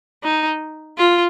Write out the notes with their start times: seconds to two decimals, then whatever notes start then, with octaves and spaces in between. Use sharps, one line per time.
0.23 D#4
0.98 F4